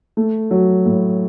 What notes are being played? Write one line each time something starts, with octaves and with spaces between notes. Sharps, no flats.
A3
F#3
A2